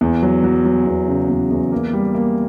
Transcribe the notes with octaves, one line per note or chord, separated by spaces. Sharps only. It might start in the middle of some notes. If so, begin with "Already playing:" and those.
E2
F#3
F#3
F#3
E2
C#3
E2
E2
A#3
G3
A#3